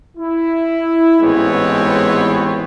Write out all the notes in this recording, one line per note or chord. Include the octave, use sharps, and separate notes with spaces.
E4
A1 G#2 G#3 B3 C4 C#5